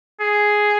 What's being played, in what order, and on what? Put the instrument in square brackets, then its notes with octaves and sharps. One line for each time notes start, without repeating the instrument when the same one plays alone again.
[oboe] G#4